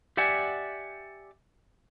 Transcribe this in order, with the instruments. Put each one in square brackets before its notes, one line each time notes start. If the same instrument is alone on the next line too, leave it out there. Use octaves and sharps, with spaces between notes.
[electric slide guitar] G4 D5 E5 F#5 G#5